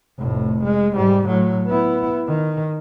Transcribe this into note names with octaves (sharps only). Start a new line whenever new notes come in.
F1 A2
G#3
G#2 G3
A2 F#3
B3 E4
D#3